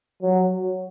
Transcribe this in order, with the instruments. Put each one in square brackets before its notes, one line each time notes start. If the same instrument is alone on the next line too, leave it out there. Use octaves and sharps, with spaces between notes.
[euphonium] F#3